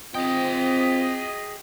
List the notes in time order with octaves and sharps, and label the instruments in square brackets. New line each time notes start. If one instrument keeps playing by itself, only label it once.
[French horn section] C4 F4 [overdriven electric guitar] G#4 G5 [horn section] D#5